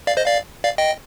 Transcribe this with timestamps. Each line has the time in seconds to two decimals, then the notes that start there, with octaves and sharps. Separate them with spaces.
0.07 D5 F5
0.17 C5 D#5
0.26 D5 F5
0.64 D5 F5
0.78 D#5 G5